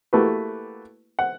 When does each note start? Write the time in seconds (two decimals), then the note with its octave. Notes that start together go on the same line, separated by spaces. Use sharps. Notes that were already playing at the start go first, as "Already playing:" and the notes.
0.13 A3 A#3 E4 F#4 G4 B4
1.19 F#5